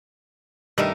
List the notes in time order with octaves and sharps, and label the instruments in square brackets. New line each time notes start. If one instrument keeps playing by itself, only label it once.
[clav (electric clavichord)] G2 D#3 G3 [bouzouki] A3 D#4 A#4